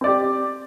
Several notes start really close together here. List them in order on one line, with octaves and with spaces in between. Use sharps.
C4 D5 G4